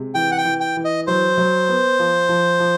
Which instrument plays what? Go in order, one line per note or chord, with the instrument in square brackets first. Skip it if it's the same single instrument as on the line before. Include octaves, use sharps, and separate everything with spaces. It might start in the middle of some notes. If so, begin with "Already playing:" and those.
Already playing: [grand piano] C3 G#3
[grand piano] E3 [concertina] G5
[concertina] F#5
G5
[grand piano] E3
[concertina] G5
[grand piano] E3
[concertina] D#5
[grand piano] F#3 [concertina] C5
[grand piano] F#3
B3
F3
F3
F3